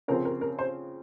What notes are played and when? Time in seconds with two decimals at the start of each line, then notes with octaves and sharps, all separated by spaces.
0.08 C#3 F3 C4 A#4
0.25 A#4
0.41 A#4
0.59 C5